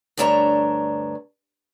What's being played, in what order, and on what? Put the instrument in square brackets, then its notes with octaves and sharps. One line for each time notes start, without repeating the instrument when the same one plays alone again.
[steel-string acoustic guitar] D2 G2 A3 D4 C#5 A#5